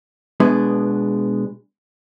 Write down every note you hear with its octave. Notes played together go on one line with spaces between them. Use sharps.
B2 G#3 B3 D4